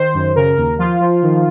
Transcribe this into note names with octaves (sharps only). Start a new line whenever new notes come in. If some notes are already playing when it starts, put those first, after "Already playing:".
Already playing: D#3 C5
F#2
C#3 A#4
D#2
F3 F4
F3
D#3